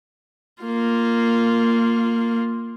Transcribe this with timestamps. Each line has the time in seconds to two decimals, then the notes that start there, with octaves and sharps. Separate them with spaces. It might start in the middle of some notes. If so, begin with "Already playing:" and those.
0.63 A#3 F4